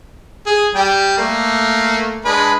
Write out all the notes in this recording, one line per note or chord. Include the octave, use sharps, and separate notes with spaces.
G#4
G3 G5
A3 A#3
G#3 D4 B4